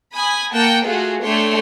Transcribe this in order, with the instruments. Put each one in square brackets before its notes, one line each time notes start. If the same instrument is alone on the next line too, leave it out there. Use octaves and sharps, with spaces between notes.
[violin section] G#5 B5 D#6
A#3 F#5 G5 A5
A3 F4 F#4 G#4
A3 D4 C#5 G5 C6